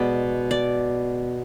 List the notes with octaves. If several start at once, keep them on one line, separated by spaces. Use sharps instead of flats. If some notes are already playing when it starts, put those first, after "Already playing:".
Already playing: B2 G#3 B3 D5
D5